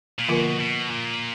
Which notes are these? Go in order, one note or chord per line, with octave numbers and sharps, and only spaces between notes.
A#2
B2 D3 F3 A#3 F4 A#4
B2
A#2